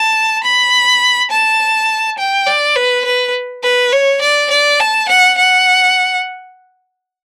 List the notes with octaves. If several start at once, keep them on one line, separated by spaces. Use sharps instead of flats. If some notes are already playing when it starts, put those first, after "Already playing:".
Already playing: A5
B5
A5
G5
D5
B4
B4
B4
C#5
D5
D5
A5
F#5
F#5